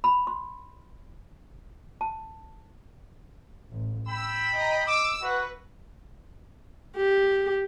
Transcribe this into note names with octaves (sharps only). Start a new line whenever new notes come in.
B5
C6
A5
A1
G5 B5 E6
D#5 A#5
D6 E6
F#4 B4 E5 F#5
G4